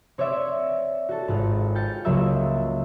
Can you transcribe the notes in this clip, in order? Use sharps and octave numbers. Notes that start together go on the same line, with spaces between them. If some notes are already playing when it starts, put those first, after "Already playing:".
C4 C#5 D5 E5
F#4 A4
G#1 F4 F#5
G5 F6 A6 C#7
C#2 C#3 F#3 A#3 E5 E6